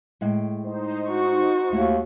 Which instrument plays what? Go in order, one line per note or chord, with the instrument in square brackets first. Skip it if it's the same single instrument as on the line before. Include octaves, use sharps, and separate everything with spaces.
[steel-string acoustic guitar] A2 G#3 G5
[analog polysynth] D#4 C5
[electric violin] F#4 C#6
[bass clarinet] D#2 [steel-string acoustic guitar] A3 E4